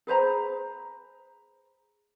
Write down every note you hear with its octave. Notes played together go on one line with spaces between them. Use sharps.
G#4 B4 C5 A#5